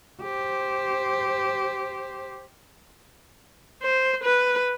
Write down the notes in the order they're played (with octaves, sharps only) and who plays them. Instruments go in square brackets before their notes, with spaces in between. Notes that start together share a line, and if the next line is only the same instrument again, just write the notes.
[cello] G4 C5
[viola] C5
B4